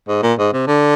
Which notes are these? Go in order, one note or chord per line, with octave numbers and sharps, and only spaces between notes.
G#2
A#2
G#2
C3
D3